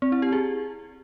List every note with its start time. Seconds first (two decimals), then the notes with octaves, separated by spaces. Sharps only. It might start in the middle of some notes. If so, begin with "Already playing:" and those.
0.02 C4
0.12 E4
0.22 G4
0.32 G#4